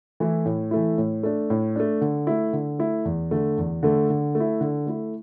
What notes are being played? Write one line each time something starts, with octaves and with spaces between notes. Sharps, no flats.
E3 A3 E4
A2
E3 A3 E4
A2
A3 D4
A2
A3 D4
D3
A3 E4
D3
A3 E4
E2
D3 A3
E2
D3 A3
D3
A3
E4
D3
A3 E4